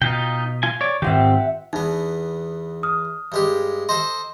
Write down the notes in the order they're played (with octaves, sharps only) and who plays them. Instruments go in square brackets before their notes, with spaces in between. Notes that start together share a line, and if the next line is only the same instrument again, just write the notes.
[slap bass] B2 [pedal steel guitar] D#4 F4 G5
[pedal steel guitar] F4 G#5
C#5 D5
[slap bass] G#2 D#3 [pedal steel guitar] C4 F4 G4 [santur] E5 F#5 G5
[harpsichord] E2 B3 [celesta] D#4
[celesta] D#6 F6
[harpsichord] G2 G#3 G4
[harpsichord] A4 C5 D#5 [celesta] C6